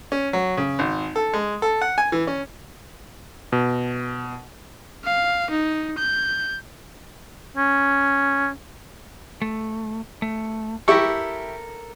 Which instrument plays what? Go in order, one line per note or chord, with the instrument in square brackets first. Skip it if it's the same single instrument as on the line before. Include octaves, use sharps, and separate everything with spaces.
[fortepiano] C#4
F#3
C#3
G#1
A4
G#3
A4
F#5
G#5
E3
C#4
[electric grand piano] B2
[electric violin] F5
D#4
G6
[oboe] C#4
[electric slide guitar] A3
A3
[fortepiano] E4 G4 C#6 [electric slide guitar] A4 A#4